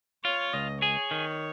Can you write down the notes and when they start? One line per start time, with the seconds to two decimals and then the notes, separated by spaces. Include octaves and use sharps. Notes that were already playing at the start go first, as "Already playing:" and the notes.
0.24 F4 C#5
0.53 C#2 D#5
0.82 G#4 C#5
1.11 D#3